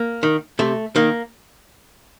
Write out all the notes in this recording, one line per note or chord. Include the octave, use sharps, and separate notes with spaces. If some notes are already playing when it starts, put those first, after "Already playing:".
Already playing: A#3
D#3
C3 A3
D#3 A#3